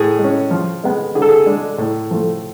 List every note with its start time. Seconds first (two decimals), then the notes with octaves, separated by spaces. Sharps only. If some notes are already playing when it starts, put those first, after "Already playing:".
Already playing: A2 G#4
0.19 G#3
0.24 C#4
0.51 F3
0.84 G#3 B3
1.15 D3 G#4
1.22 A4
1.29 G#4
1.46 G#3 D4
1.78 A2
2.11 F3 A3